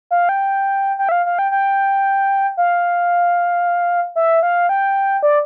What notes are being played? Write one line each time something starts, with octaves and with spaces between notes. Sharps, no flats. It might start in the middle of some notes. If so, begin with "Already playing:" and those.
F5
G5
G5
E5
F5
F5
G5
G5
F5
E5
F5
G5
D5